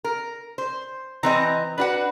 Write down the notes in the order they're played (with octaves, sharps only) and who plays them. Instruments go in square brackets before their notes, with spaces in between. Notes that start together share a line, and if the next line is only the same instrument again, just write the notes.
[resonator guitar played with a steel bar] A#4
C5
[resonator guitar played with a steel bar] E3 C4 D#5 [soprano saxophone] A#5
[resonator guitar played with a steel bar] D4 F#4 F#5 [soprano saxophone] B4